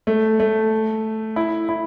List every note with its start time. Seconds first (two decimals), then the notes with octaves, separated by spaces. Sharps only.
0.07 A3
0.40 A3
1.36 E4
1.69 E4